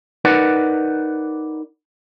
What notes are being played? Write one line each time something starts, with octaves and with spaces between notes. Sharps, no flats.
D#4 A#4 B4 D5 F#5